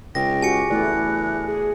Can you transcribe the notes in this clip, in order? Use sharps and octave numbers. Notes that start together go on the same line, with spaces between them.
C#2 C#3 G5 A#6
F#4 G4 G#5 C#7
E2 A3 E4 D5 F#6
G#4